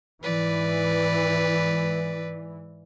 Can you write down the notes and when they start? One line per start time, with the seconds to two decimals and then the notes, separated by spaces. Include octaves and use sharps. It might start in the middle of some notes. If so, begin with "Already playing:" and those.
0.22 G#2 E3 B4 D5